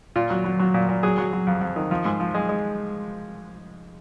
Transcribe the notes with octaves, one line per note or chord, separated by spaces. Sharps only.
A#2 F4
F#3
F#3
F#3
A#2
A#2
F#3 G#4
F#3
F#3
F2
F2
D#3
F3
G#2
F3
G#3
G#3